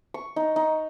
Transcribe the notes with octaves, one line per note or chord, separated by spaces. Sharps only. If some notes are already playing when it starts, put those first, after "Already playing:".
C#6
D#4
D#4